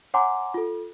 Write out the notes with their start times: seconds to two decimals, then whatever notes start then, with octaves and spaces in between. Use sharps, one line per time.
0.14 C#5 F#5 G#5 A#5 C6 D6
0.54 F4 A4